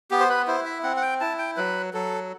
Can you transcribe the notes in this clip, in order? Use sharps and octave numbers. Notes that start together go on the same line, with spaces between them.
B3 G4
C5
B4
E4 C5
E5
C4 F#5
F#5
G5
E4 A5
G5
F#3 B4
F#3 A4